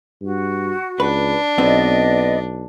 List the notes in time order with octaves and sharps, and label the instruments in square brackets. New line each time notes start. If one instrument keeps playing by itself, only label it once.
[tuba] G2 [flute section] F#4
[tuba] C#2 [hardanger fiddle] D4 [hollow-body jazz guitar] B4
[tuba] B1 [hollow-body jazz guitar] B3 C4 [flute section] D5 D#5